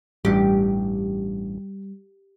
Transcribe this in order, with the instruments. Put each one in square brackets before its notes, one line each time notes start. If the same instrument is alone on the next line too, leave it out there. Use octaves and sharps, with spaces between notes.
[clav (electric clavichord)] A1 G2 [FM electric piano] G3 [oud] G4